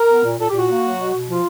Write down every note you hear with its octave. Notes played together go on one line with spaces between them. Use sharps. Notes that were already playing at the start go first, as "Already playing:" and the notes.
Already playing: A#4
B3
A#2
A#2 A4
G4
A#2
F#4
A#3
F#3
B2
B2
F3 F4